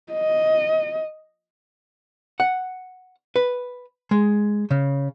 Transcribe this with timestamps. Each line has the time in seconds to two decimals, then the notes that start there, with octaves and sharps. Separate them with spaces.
0.12 D#5
2.40 F#5
3.36 B4
4.11 G#3
4.71 C#3